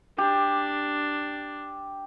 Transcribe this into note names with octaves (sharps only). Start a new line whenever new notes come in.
D4 G4